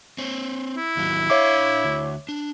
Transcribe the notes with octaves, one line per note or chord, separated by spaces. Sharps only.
C4 C#5
E4
D#2 F#3
D4 C#5 E5 F5 D6
D2
D4